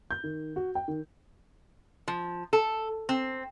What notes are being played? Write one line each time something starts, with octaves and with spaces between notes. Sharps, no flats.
G6
D#3
F#4
G5
D#3
F3
A4
C4